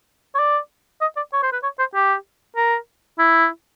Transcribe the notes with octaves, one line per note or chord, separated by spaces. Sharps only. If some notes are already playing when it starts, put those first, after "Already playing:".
C#5
D5
D#5
D5
C#5
C5
B4
C#5
C5
G4
A#4
E4